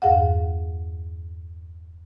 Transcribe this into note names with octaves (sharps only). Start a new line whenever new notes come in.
E2 G2 G#4 F5 F#5